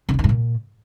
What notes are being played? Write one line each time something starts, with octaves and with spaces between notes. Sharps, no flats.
D3
C#3
D#3
G#2
A#2